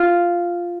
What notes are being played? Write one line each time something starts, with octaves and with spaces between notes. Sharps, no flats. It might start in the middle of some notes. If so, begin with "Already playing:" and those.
Already playing: F4